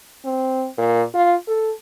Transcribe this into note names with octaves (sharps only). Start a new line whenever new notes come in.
C4
A#2
F4
A4